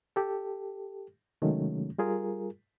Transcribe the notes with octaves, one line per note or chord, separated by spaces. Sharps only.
G4 A4
C3 D#3 F#3 G#3 A3 C#4
G3 F4 G#4 A#4